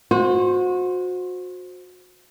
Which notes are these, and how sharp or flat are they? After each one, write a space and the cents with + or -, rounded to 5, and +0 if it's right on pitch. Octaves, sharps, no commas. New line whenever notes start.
F#4 -30 C5 +0